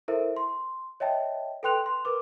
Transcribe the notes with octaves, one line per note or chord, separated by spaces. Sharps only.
E4 A4 A#4 C5 E5
C6
C#5 D#5 E5 G5 A5
A4 B4 G5 C6 F#6 F7
C6
A#4 B4 D6